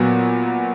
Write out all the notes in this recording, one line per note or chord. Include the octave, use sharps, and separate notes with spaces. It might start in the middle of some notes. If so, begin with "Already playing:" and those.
Already playing: A#2 F#3 B3 F#4